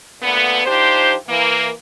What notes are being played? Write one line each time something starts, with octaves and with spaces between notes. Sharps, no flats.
A#2 D3 A3 B3
F3 D4 D#4 G4 C5
E3 A#3